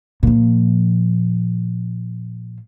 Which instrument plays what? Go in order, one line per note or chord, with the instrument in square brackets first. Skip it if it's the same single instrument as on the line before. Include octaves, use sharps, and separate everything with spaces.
[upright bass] A#2 F3